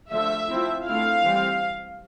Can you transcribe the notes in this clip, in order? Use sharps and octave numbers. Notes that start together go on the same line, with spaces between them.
D3 F3 A3 E5
F3 C4 E4
D3 A3 C4 E4 F5
E3 G3 C4